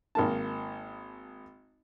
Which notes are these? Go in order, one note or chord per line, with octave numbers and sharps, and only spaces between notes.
G#1 A#3 A5